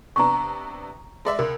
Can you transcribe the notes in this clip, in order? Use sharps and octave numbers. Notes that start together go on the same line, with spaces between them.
C3 B3 D4 A#5 C#6
G#3 D5 E5
C#2 A#4